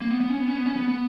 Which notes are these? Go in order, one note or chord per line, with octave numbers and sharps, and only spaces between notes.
A#3
B3
B3
C#4
B3
C#4
B3
C#4
B3
B3